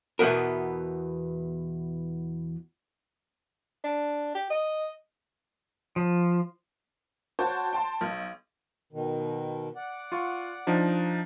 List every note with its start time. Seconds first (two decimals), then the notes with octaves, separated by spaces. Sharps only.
0.19 E2 B2 E3 B3 A#4
3.84 D4
4.35 G4
4.50 D#5
5.96 F3
7.39 F#4 C5 C#5 G5 A5 C#6
7.73 G5 A5 C6
8.01 B1
8.92 B2 D#3
9.76 D5 F#5
10.12 F4 C#6
10.67 F3 D4 D#4